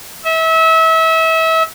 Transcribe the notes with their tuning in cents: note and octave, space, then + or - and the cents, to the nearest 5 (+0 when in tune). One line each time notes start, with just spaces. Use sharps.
E5 -30